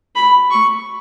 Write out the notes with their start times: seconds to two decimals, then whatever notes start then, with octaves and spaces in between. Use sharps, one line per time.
0.16 B5
0.51 C#6